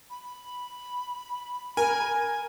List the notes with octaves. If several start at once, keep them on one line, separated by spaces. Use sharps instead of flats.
B5
A#4 G#5